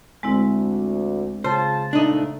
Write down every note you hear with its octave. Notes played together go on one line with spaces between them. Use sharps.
D2 G#3 C4 E4
C#3 F4 G#4 C5 A5
A#2 F3 A3 D4 D#4